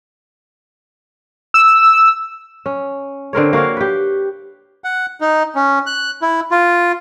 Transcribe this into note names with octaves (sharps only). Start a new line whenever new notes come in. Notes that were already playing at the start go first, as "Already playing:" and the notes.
E6
C#4
D3 C4 A#4 C#5
A#3 F#4 C#5 F5
G4 B4
F#5
D#4
C#4
F#6
E4
F4